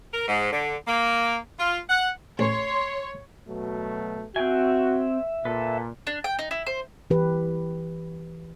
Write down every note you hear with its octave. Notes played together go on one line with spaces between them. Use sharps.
A#4
G#2
D3
A#3
F4
F#5
A1 C#5 C6
B2 F#3 A3
C4 F#4 E5 G5 G#5
A#2 A4 B4
D4
G5
D#4
E4
C5
E3 G4 B4